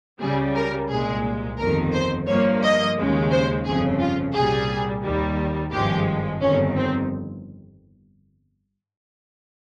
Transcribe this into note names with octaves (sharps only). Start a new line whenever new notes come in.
C#2 C#3 G3 G#4
A#4
C2 A#2 G#3 G#4
G1 F2 D#3 A#4
C5
G2 F3 A#3 C#5
D#5
D#2 C#3 G#3
C5
G1 F2 C#3 G#4
F4
C2 A#2 G3 G#4
D#2 D#3 G3
G#1 G2 F3 G#3 G4
G1 F2 D#3 C#4
C4